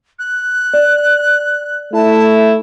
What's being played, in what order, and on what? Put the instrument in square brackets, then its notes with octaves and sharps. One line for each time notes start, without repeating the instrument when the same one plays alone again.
[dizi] F#6
[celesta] D5
[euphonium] A3 [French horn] E4 [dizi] A5